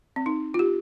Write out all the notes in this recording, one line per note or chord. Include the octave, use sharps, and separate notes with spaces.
C4
D#4
F4
G4